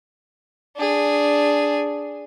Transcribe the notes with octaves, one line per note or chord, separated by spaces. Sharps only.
D4 G#4